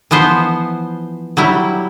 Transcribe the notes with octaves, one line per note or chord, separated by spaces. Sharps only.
E3 F3 B3 C5
F#3 G3 E4